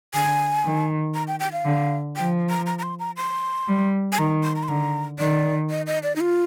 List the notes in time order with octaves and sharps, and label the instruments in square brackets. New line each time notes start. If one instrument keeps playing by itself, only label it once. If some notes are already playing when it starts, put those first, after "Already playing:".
[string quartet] D3 [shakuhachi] G#5
[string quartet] D#3
[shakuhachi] A#5
G5
G5
F5
[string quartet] D3
[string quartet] F3 [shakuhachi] G5
[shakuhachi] A#5
A#5
A#5
C6
A#5
C6
[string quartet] G3
[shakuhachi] G#5
[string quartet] D#3 [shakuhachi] A#5
[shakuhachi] C6
A#5
C6
[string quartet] D3 [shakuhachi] A#5
[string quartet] D#3 [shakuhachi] D5
[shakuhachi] D#5
D#5
D5
D#4
F4